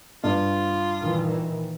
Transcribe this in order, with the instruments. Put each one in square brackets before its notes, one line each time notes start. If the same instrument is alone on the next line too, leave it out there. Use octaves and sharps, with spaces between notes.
[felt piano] G2 [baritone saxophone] F4
[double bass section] A#2 D#3 E3